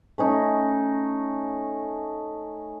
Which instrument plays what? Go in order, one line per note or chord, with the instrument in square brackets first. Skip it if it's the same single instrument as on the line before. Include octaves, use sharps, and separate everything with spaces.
[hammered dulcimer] A3 C#4 D#4